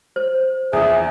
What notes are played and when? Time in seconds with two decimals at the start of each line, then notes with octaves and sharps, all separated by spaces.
0.16 C5
0.73 A#1 E2 G#4 E5